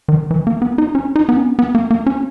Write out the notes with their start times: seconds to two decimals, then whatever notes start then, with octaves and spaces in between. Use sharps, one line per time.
0.08 D#3
0.31 E3
0.47 A#3
0.62 B3
0.78 D#4
0.95 C#4
1.16 D#4
1.29 B3
1.37 C#4
1.59 B3
1.75 A#3
1.91 A#3
2.07 C#4